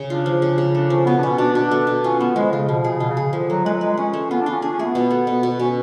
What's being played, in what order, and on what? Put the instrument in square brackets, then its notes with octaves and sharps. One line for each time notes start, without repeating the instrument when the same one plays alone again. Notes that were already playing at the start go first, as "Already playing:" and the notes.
Already playing: [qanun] C#3
[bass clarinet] D4 [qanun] F4
[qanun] F3
C#3
C#3
[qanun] A3 [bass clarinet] D4
[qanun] F3 [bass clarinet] C#4
[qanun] B2 [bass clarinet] B3
[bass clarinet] D4
[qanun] B2 [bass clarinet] C#4
[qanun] B2 [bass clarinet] D4
[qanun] B2 [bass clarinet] D4
[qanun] A3
B2
[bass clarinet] C#4 [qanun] F4
[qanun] A3 [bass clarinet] B3
[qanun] F3 [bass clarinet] G#3
[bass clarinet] C#3 [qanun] F4
[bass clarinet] B2 [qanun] F3
[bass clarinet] B2
[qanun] G#4
[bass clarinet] C#3
[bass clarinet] B2 [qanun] F4
[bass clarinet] C#3
[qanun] G#4
[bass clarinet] C#3
[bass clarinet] D3 [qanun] F3
[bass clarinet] F#3 [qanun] A3
[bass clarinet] G#3 [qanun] B4
[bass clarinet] F#3
[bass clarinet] G#3 [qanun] B4
[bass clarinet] C#4 [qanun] G#4
[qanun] A3
[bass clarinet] B3 [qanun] F4
[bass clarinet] D4
[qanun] F4
[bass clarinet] C#4
[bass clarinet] D4 [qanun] G#4
[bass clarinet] C#4
[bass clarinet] A3 [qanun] G#4
[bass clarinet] B3
[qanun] B2
A3
B2
B2
[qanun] B2 [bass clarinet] C#4